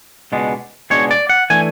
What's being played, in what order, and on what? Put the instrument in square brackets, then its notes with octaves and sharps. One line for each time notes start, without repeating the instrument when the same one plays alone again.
[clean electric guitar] C#2 B2 G#3 D4
C#2 B2 G#3 D4 C#5
D5
F#5
E3 A3 D4 G#5